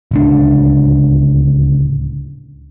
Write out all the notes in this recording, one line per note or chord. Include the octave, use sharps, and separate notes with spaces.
D1 C#2 D4